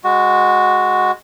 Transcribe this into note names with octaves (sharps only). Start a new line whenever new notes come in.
G#3 F#4